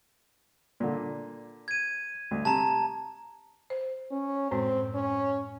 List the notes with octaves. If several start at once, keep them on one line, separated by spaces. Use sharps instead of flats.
A#2 D3
G#6 D#7
D2
C3 A5 A#5
C5
C#4
F#2 A2 G#3 C4
C#4